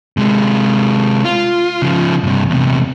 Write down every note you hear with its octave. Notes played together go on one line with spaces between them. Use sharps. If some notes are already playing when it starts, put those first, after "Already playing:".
C3 G#3
F4
C#3 F3
G2 C3
E2 C3